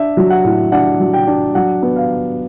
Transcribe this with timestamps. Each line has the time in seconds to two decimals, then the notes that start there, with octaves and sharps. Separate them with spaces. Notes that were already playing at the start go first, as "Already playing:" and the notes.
Already playing: D4 E5
0.17 F#3
0.30 F#5
0.44 A2
0.72 D4 F#5
1.00 F#3
1.14 G5
1.27 D4
1.55 F#3 F#5
1.82 B3
1.96 F5